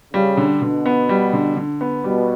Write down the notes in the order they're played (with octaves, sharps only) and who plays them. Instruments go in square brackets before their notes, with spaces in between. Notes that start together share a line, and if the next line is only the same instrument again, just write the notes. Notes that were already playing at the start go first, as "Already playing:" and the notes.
[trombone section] C#3 [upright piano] G3
[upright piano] D3
[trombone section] B2 [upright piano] D3
[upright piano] B3
G3
D3
D3
B3
[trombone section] B2 [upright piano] G3